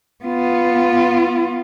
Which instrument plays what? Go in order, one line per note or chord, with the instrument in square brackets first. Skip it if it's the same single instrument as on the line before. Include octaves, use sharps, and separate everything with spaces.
[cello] B3 F4